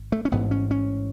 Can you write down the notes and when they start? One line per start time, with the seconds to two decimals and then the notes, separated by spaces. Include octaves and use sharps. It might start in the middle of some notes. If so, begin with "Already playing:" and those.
Already playing: G#1
0.12 A3
0.25 C#4
0.31 A1 G#2 B3
0.51 C#4
0.71 C#4